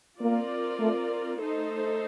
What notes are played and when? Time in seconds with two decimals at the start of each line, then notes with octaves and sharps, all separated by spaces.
0.21 A#3 C4 F4 A#4 D5
0.80 A3
1.40 A3 D#4 A4 C5